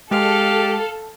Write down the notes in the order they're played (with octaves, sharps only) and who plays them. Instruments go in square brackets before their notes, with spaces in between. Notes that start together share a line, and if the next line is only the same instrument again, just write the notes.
[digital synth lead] G#3 [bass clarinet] G4 [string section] A4 [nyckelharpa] F5